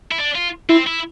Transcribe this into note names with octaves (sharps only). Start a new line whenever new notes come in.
E4
D4
F4
C4 E4
E4